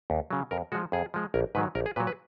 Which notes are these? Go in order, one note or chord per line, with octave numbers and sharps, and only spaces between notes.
D#2
C#3 F#3
F2 A#4
F3 G#3 F#4
F2 G#4
F3 G#3
A#1 A#4
G#2 D#3 F#3 B4
A#1 A#4
G#4
A#2 F#3 B4
B4